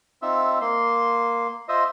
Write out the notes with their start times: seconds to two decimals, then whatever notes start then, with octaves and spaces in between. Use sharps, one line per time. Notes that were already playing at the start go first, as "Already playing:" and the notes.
0.22 C4 D#4 F4 E5
0.61 A#3 C6
1.69 F4 C5 D#5 E5